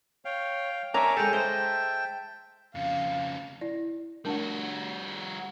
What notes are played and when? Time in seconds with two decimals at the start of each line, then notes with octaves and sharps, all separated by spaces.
0.25 C#5 F5 G5
0.94 D4 A#4 C#5 E5 G#5 A#5 D6
1.17 G#3 A4 G5
1.33 C5 D#5 E5 G5 A5
2.75 F2 C#3 F5
3.61 E4 D5
4.25 G3 A3 D4 F#4 A#4